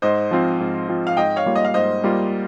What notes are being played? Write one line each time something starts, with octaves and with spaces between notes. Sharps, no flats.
G#2 C5 D#5
F3 C4 F4
G#2
F3 C4 F4
F5
G#2 D#5 G5
C#5 F5
G3 A#3 F4
D#5
F5
G#2 C5 D#5
G3 A#3 F4